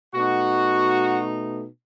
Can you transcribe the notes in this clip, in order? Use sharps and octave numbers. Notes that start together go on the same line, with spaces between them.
B2 A3 D#4 F#4